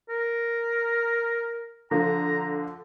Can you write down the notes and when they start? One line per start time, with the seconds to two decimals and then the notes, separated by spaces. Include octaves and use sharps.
0.09 A#4
1.91 D3 F3 A#5